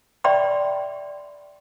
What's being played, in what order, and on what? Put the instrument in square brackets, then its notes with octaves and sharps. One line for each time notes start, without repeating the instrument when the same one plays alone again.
[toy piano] D5 E5 G5 B5 C6